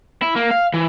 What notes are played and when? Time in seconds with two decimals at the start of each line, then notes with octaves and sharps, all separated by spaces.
0.22 E4
0.36 A#3
0.51 F5
0.74 E3